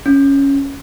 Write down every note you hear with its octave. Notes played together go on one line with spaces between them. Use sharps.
C#4